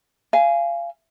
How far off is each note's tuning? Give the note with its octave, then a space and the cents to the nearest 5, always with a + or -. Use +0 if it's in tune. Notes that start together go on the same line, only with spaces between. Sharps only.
F5 -25 G#5 +0